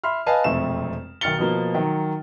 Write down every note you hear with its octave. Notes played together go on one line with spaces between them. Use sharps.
E5 B5 C6 F6
B4 D#5 F5 G#5 A5
E1 F2 C3 A3 C4 E7
B1 D#3 F6 A6 C#7 G7
B2 F3 A#3
D#3 F#3